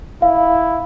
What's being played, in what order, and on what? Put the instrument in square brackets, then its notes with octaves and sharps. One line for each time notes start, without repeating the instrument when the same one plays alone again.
[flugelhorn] E4 [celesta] F5